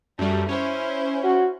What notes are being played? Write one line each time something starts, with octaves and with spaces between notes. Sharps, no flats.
F#2 G3 A3
C#4 E4 C5
F#4